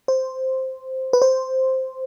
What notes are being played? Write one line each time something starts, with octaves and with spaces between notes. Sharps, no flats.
C5
B4
C5